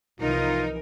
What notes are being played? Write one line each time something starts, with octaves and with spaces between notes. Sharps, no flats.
C2 E3 F3 D#4 F4 A#4